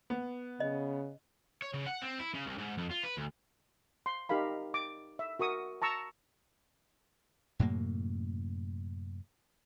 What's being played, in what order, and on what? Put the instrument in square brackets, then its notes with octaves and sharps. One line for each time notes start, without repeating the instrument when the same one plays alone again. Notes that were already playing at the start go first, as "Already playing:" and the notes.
[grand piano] B3
[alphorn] C#3 [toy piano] D#5
[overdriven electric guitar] C#5
C#3
F#5
C4
E4
C#3
C2
G#2
F2
F4
B4
D2
[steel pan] C6
D#4 G4 A#4 F5 B5
D6
E5
F#4 A#4 C#6 D#6
A5 A#5 C#6 E6
[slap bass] F#2 A2 C3 A#3